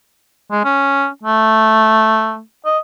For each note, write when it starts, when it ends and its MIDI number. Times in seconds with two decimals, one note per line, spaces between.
0.51 0.62 56
0.64 1.07 61
1.23 2.41 57
2.66 2.78 75